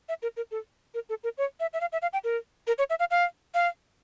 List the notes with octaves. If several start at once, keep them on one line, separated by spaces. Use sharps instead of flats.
E5
A#4
A#4
A4
A#4
A4
A#4
C#5
E5
E5
F5
E5
F5
G5
A#4
A#4
C#5
E5
F5
F5
F5